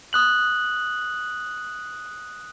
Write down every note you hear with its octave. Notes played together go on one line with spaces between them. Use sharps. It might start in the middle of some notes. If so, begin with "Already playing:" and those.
D#6 F#6 F#7